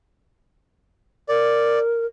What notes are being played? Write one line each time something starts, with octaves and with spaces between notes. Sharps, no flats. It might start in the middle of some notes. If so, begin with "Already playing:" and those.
A#4 D5